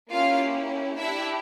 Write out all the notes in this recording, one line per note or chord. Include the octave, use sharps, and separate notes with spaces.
A#3 C#4 E4 F4 G4 F5
D4 E4 G4 E5